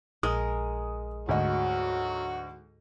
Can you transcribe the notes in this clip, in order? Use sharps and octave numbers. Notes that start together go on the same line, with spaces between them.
A#1 G#3 A#4 D#6
D2 G#2 F#3 F#4 D#5